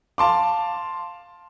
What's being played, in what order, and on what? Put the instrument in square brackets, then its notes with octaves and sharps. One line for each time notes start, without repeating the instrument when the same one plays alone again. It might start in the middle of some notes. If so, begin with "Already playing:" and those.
[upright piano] F5 A5 C6 D6